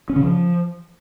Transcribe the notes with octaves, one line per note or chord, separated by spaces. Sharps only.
C#4
C#3
F3